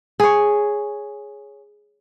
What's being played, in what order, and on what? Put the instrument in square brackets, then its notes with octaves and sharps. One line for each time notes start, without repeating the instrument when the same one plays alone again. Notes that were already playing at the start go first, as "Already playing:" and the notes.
[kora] G#4 C#5